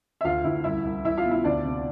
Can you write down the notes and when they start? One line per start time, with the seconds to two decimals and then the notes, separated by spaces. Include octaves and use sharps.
0.21 E5
0.24 D2 F4 F5
0.44 D2 E4 E5
0.64 C2 E4 E5
0.85 C2
1.05 C2 E4 E5
1.17 F4 F5
1.24 B2
1.31 E4 E5
1.44 D2 D4 D5
1.65 C3